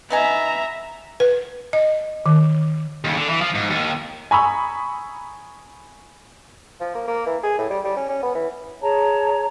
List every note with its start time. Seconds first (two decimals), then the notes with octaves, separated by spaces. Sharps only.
0.10 B3 D#4 E5 G#5 A#5
1.20 B4
1.73 D#5
2.26 D#3
3.04 D#2 C#3
3.16 D3
3.29 E3
3.41 F3
3.55 G#2
3.70 D#2 D#3
4.31 G#5 A#5 B5 C#6 D#6 E6
6.80 F3
6.95 A#3
7.08 A#3
7.26 E3
7.43 G#4
7.58 A2
7.70 G3
7.84 G3
7.96 C#4
8.09 C#4
8.23 B3
8.35 E3
8.81 G#4 C#5 A5 A#5